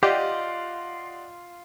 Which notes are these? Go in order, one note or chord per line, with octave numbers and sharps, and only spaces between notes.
F4 G4 D5 D#5 F#5